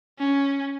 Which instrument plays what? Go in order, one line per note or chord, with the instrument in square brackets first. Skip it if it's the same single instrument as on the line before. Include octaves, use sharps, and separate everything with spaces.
[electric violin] C#4